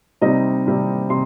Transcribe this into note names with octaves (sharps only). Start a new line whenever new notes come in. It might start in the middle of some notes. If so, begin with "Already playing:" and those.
C3 G3 C4 D#4 D#5
C3 G3 C4
C3 C6